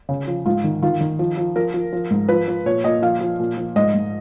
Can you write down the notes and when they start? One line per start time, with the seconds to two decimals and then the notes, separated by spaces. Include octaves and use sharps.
0.09 C#3
0.27 F3
0.46 G#2 F4
0.64 D#3
0.82 D#3 F4
1.01 D#3
1.19 F3
1.37 F3
1.56 F3 A#4
1.74 F3
1.93 F3
2.11 G#2
2.29 F3 B4
2.48 F3
2.66 A#2 C#5
2.84 A#2 D#5
3.02 F3 F5
3.21 F3
3.40 A#2
3.57 F3
3.76 G#2 D#5
3.94 G#2